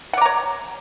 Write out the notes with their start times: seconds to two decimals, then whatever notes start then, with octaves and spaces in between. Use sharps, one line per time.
0.13 F#5
0.17 D5
0.21 A#5
0.26 C#5